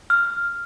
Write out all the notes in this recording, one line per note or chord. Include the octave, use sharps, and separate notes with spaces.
F6